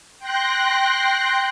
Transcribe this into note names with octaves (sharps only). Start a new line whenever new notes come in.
G5 C6 F#6 A#6